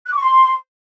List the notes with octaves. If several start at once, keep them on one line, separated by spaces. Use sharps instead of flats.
F#6
D6
C#6
C6